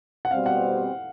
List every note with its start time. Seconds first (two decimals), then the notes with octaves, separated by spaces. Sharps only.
0.25 F#5
0.31 B2 G3 C4 F5
0.46 F#5